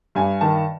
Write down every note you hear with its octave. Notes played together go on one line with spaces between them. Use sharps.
G2 G#5
D#3 A5